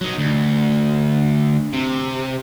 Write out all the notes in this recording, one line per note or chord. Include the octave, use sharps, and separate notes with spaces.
F#3 D#4
D2
C3